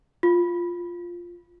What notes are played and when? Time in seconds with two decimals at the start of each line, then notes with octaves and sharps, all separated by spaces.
0.23 F4